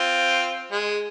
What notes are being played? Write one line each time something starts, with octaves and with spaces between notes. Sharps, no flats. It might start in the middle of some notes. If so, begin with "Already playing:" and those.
Already playing: C4 F4
G#3